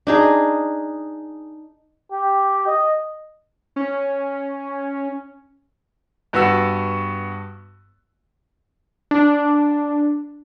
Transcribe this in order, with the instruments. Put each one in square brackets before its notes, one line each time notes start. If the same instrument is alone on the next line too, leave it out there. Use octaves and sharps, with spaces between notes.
[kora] D4 D#4 G#4
[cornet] G4
D#5
[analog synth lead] C#4
[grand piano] G2 B3 F#4 C#6 E6
[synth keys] D4